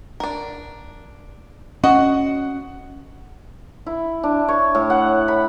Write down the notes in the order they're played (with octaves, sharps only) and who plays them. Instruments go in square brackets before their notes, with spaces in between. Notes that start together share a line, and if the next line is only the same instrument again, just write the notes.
[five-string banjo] D4 A#4
[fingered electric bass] C#4 [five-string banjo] F#4 D#5 [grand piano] F#5
[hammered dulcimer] E4
D4
C#5
A2
F#5
B5